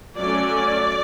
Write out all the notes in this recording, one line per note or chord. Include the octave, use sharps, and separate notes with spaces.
F#3 A3 C#4 D5